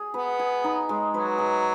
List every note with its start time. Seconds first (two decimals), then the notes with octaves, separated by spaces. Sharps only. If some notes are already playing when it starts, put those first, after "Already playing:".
Already playing: G#4
0.14 B3 B4
0.40 G#4
0.64 D#4
0.89 G#3
1.14 F#3 B4
1.38 G#4